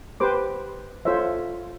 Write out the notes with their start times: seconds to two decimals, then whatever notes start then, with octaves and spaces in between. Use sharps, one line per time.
0.20 G4 B4 C5 D6
1.05 F4 A4 C5 C#5 E5